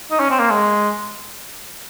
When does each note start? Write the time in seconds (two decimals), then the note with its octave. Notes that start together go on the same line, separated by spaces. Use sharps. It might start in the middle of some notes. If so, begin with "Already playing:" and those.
0.11 D#4
0.20 C#4
0.30 C4
0.39 A#3
0.50 G#3